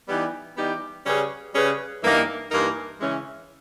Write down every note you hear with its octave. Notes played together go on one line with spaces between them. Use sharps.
E3 G3 B3 D#4 G4
E3 G3 B3 D#4 G4
C#3 G3 C#4 G#4 B4
C#3 G3 C#4 G#4 B4
G2 E3 A#3 D#4 A#4
G2 E3 A#3 D#4 A#4
C#3 E3 G#3 C#4